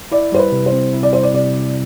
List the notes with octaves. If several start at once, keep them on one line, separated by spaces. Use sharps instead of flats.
E4 D5
G3 C5
B4
C3
C5
C4
E4
D5
G3 C5
D5
C3 D5
C4